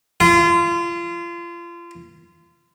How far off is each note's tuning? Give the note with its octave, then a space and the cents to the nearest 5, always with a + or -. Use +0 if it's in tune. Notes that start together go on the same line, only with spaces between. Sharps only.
F4 -30